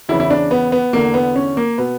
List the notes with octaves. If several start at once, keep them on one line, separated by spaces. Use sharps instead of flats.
E2 C#3 E3 E4
E4
D4
B3
B3
E2 D3 A#3
B3
C#4
A#3
B2 B3